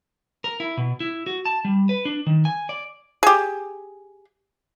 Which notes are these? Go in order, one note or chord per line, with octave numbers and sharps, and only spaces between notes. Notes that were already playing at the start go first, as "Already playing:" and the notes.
A#4
E4
B2
E4
F#4
A5
G3
B4
D4
D#3
G#5
D5
G4 G#4